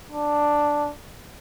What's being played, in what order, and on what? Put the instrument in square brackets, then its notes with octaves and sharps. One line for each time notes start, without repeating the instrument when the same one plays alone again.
[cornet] D4